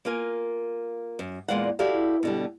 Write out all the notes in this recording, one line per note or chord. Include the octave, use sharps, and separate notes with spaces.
A#3 F4 A#4 G#5
F#2
E2 A#2 G#3 D5 F5 F#5
E4 F#4 G4 A4 D5 F5
B2 D3 G3